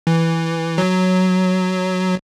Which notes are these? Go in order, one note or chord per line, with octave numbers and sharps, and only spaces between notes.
E3
F#3